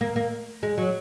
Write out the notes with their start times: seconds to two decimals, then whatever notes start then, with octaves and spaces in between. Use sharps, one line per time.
0.01 A#3
0.16 A#3
0.63 G#3
0.78 F#3